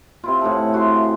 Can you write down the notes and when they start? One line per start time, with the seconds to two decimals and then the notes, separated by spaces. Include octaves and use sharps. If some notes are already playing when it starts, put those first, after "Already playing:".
0.24 C3 E4 F4
0.41 A2 G#4 F#5 A5
0.74 F#4 F5 C6